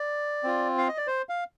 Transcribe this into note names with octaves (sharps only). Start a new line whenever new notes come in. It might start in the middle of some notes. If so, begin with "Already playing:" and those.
Already playing: D5
C4 F4
F5
D#5
D5
C5
F5